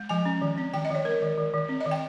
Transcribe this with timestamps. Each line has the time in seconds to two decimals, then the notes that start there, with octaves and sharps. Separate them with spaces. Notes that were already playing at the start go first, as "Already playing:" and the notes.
Already playing: G#3
0.09 F3 G#5
0.25 C#4
0.41 D#3
0.58 C4
0.73 D#3 G5
0.85 D#5
0.90 D#3 C#5
1.05 G#3 A#4
1.22 D#3
1.37 D#3
1.54 D#3
1.69 C4
1.81 D#5
1.86 D#3
1.91 G5